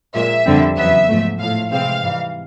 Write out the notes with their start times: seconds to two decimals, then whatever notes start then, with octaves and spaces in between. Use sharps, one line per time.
0.14 A#2 F3 G#3 E5
0.45 F2 D3 G3 C4
0.77 E2 C#3 F#3 B3 E5
1.08 G#2 F3 A3
1.40 A2 F3 A3 F5
1.71 C3 E3 G#3 C4 F5
2.03 G#2 E3 G3